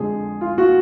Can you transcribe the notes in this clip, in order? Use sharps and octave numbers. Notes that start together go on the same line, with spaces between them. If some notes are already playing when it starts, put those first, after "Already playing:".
Already playing: F2 D3 G#3 G#4
F4
F#4